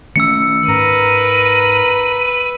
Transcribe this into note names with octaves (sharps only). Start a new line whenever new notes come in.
D#3 A3 C#4 E6 C#7
G#2 A#4 B4 D#7